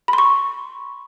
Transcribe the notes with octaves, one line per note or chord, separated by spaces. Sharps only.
B5
C6
C#6